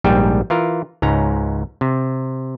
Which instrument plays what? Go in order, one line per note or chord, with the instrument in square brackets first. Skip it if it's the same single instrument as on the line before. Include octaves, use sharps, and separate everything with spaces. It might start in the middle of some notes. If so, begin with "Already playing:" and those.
[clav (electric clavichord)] A#1 G#2 G3 G5
E3 F4 A#4
C#2 G#2 C#4 A#5
C3